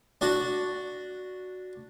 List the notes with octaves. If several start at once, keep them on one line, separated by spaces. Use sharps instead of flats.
D4 F#4